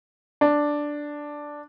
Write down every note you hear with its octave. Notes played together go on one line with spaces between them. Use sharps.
D4